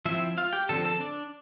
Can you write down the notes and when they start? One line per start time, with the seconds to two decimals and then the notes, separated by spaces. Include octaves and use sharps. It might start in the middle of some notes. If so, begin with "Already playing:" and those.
0.05 F3 C4 E4 E5
0.38 F4 F5
0.53 G4 G5
0.69 D3 F3 C4 A4 A5
0.85 A4 A5
1.00 D4 D5